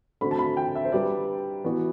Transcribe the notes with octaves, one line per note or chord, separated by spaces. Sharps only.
D3 A3 C4 F#4 C5 B5
A5
B5
G5
E5
C5
G3 D4 G4 B4 D5
E3 B3 F#4 B4